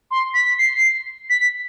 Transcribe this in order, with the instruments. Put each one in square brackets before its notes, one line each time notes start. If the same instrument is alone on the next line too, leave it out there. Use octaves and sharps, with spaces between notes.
[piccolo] C6
B6
C7
B6